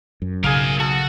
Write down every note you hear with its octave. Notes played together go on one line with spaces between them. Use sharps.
F#2
B1 C#3 G#4 A#4 F5 G#5
F#4 A4